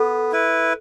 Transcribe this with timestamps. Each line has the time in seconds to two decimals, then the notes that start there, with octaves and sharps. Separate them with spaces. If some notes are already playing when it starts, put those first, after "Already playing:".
Already playing: B3 A4
0.32 E4 B4